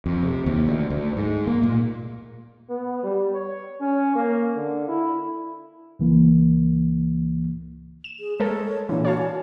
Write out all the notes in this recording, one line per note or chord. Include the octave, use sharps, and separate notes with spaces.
F2
C3
D#2
D2
D2
G#2
A#3
A#2
B3
G3
C#5
C#4
A#3
D3
E4
C#2 E3 A#3
E7
G#4
G#3 A4 A#4 C#5
A#2 E3 D4
F#4 C#5 F5 A5
G#5